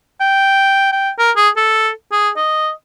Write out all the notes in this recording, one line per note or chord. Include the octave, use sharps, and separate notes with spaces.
G5
G5
A#4
G#4
A4
G#4
D#5